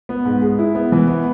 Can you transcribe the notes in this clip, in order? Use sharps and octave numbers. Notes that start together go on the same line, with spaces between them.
B3
G#2
G#3
E4
B3
E3
B3